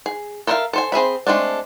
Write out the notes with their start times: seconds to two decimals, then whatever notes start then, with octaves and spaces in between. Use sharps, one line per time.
0.06 G#4
0.47 A4 A#4 C5 E5 F5
0.73 A4 C5 G#5
0.92 C4 G#4 E5 B5
1.27 G#3 A3 C4 D4